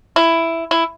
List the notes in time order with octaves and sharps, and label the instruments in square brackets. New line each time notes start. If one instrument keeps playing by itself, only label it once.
[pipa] E4
E4